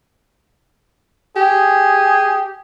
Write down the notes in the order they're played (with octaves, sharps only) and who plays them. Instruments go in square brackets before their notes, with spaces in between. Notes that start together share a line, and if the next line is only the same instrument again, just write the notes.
[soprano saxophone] G4 [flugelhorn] G#4